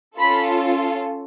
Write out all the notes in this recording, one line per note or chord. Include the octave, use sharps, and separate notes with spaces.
C#4 F4 A4 B5